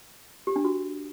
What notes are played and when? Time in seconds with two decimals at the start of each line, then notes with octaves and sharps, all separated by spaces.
0.47 G4
0.56 D4
0.64 F#4